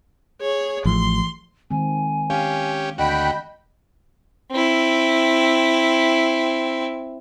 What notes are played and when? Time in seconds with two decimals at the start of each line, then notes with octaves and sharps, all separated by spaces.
0.41 G#4 C#5
0.85 A1 F3 C6
1.71 D#3 G#3 C4 G#5
2.30 C#4 G4 F5
2.98 D2 F#4 D#5 G5 B5
4.51 C4 E4